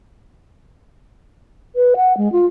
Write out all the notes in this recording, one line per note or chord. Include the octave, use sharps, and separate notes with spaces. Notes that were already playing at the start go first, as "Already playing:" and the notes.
B4
F#5
G#3
F4